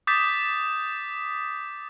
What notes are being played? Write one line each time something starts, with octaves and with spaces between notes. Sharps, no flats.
D6 D#6 G6 A6 B6